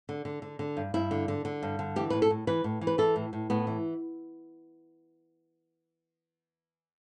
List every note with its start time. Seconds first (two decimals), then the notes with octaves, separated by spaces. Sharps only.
0.09 D3
0.25 D3
0.42 D3
0.59 D3
0.77 G2
0.94 G2 E4
1.11 D3
1.28 D3
1.45 D3
1.63 G2
1.79 D3
1.96 E3 G4
2.10 A2 B4
2.22 A4
2.31 A2
2.47 E3 B4
2.64 A2
2.81 E3
2.87 B4
2.98 E3 A4
3.16 A2
3.33 A2
3.50 A2 B3
3.67 E3